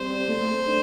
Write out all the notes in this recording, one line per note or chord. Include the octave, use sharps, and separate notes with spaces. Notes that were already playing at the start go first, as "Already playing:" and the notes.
Already playing: G3 C4 G4 C5 D5
A3
D4